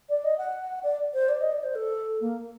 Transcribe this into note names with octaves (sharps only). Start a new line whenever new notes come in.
D5
D#5
F#5
D5
C5
D5
D#5
D5
C5
A4
A#3